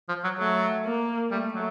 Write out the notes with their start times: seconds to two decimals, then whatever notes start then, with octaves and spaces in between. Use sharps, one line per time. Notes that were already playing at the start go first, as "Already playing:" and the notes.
0.09 F3
0.24 F#3
0.39 F#3 A3
0.85 A#3
1.30 G3 A3
1.53 F#3